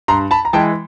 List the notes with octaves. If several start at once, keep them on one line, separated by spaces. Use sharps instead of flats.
G2 A#5 C6
A5 B5
A#5
E3 G#3 G5 A5